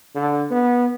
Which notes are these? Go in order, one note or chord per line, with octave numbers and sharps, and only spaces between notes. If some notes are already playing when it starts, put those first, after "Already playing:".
D3
B3